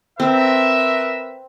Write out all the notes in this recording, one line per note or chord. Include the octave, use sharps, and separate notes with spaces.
C4 A#4 B4 E5